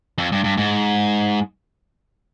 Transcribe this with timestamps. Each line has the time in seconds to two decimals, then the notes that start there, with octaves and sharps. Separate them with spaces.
0.18 F2
0.32 G2
0.44 G2
0.57 G#2